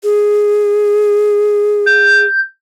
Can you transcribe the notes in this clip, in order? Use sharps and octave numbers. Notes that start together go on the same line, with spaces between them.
G#4
G6